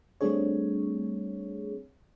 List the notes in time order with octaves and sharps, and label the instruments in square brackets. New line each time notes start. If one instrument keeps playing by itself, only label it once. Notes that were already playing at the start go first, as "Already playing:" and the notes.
[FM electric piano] G3 A3 C4 D4 G#4 C#5